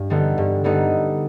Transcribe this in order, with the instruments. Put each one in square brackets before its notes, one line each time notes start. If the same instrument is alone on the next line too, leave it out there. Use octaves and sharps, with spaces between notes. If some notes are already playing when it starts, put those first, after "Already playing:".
Already playing: [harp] G2
D3 G3 B3 D#4
G2
D3 G3 B3 D#4